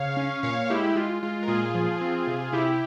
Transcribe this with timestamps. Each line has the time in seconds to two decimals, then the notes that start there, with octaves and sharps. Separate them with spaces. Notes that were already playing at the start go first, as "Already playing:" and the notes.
Already playing: C#3 C#5 F5
0.17 C#4
0.43 A#2 C#5 F5
0.70 G#3 E4 G4
0.95 G#3 F4
1.23 G#3 F4
1.43 A#4
1.48 A#2 F4 G#4
1.75 F3
2.01 C4
2.27 C3
2.52 C3 E4 G4